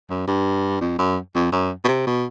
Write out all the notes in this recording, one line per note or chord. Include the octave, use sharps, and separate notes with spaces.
F#2
G2
F2
F#2
F2
F#2
B2
C3
B2